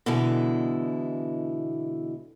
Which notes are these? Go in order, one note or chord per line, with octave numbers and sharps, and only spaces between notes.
B2 D3 E3 G#3 E4